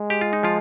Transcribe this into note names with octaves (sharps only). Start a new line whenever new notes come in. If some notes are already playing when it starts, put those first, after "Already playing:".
Already playing: G#3
G4
F4
D#4
F3 F4